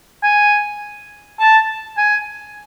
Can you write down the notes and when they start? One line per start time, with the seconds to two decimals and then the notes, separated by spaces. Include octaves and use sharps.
0.23 G#5
1.39 A5
1.97 G#5